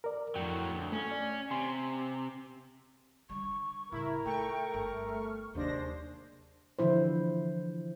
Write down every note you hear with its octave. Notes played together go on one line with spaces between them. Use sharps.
A#4 D5
F2 A2 F#3 G5
D2
A3 C#4
D5
C3 G#5 C6
D3 G3 C#6
A2 C#3 E4 A#4
A3 F4 G5 C#6
G1
F6
D#2 C3 F#3 G#3 D4 C5 A#6
D3 E3 F3 E4 C5